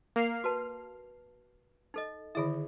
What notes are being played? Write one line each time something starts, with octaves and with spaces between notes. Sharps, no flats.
A#3 F6 C7
F#4 B4 A5
D#4 A4 D#5
D3 D#3 E4 G#4 E5